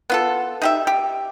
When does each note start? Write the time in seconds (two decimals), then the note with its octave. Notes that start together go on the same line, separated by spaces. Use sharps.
0.10 B3 F4 A4
0.62 D#4 G4 E5
0.87 G4